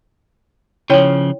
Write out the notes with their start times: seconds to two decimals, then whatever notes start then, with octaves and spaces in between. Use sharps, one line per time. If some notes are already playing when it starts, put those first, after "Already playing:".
0.90 C#3 F3 E4 C#5 G5